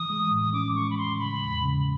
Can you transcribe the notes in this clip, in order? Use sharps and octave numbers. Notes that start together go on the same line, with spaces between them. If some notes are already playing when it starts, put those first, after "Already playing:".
Already playing: E3 D#6
G#3
A2
D#6
C#4 D6
G#3 C#6
B5
A2 C6
C#3 B5
E2
C#3